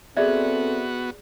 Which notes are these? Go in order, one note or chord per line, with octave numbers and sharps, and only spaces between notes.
B3 C4 F#4 G#4 A4 D5 E5